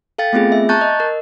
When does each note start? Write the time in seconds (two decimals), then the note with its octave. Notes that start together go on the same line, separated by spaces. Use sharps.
0.18 A4 F5 G5 A6
0.33 A3 B3 C4 F4 G#4
0.52 E5
0.69 A5 A#5 C#6 F#6 G6 A6
0.81 D#5
1.00 A#4